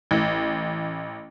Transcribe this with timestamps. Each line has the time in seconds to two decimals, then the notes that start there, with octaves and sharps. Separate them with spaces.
0.11 A1